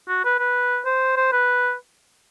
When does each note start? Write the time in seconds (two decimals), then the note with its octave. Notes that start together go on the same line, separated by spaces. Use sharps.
0.08 F#4
0.25 B4
0.39 B4
0.85 C5
1.16 C5
1.32 B4